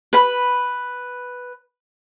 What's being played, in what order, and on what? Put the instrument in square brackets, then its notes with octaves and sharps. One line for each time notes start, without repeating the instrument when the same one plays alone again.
[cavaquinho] B4 B5